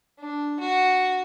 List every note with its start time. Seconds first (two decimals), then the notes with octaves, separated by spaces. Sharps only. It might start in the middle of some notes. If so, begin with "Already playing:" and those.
0.20 D4
0.60 F#4